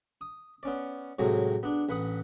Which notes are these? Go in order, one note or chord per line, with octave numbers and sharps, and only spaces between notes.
D#6
B3 C#4 D5
A2 C3 F#3 G#3 A3
B3 D4
A1 B4 F#5 D#6